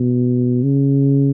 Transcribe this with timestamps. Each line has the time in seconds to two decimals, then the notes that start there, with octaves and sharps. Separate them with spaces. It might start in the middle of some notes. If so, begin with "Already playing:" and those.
Already playing: B2
0.63 C#3